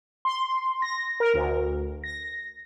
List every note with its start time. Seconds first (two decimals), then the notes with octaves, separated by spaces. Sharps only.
0.25 C6
0.82 A#6
1.20 A#4
1.34 D2
2.04 A#6